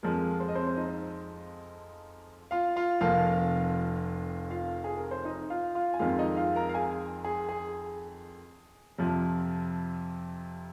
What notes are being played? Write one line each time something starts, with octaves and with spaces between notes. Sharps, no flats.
F2 F3 G#3 A#4
C5
D#5
C4 C5
C5
D#4 D#5
F4 F5
F4 F5
F1 F2 F3 A#3 F4 F5
F4 F5
G#4
A#4
C5
D#4 D#5
F4 F5
F4 F5
G#5
F2 D#3 G#3 F4 F5
D#4 D#5
F4 F5
A#4 A#5
F5
G#4 G#5
G#4
G#4
F2 C3 F3